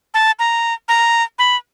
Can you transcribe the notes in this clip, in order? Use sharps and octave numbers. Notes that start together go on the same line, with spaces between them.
A5
A#5
A#5
B5